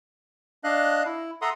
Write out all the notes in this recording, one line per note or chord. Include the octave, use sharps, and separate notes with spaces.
D4 D#5 F5 F#6
E4
A4 E5 F#5 A#5 C6 D#6